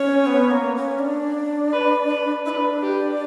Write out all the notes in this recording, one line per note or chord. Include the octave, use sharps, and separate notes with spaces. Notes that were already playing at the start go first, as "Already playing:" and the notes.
Already playing: C#4 C#5
B3
A#3
C#4
D4
B4
B4
D4 E4 B4
G4